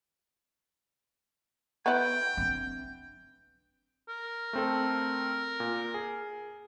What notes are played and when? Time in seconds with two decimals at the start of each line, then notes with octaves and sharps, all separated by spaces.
1.86 B3 E4 G5
2.37 C4 D4
4.09 A#4
4.53 A3 C4 A4
5.60 A#2
5.94 G#4